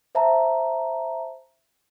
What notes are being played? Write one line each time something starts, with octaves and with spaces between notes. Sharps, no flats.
C5 E5 A5 A#5